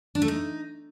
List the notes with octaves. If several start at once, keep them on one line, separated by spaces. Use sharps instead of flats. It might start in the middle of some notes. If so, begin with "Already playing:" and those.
D4
A3
D#4